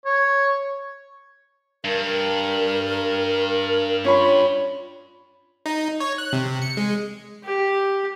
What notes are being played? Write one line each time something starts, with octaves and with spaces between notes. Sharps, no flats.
C#5
G2 A#4
C#4 F4 C#5 B5
D#4
C#5
F#6
C3
C#7
G#3
G4